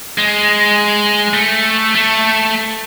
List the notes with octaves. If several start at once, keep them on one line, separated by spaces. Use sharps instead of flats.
G#3
A3
A3